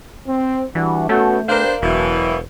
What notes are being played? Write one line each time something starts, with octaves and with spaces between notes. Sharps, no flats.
C4
E3 G3 D4 F#4
A3 B3 C#4 F#4 A4 G6
B3 D4 G4 A#4 C5 F5
E1 B2 E3 F#3 E4